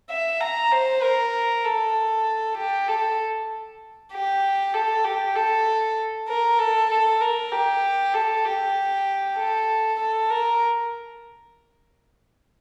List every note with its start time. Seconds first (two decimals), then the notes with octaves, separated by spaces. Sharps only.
0.10 E5
0.41 A#5
0.72 C5
1.03 A#4
1.65 A4
2.58 G4
2.88 A4
4.12 G4
4.74 A4
5.05 G4
5.36 A4
6.28 A#4
6.59 A4
6.90 A4
7.21 A#4
7.52 G4
8.14 A4
8.45 G4
9.37 A4
10.00 A4
10.30 A#4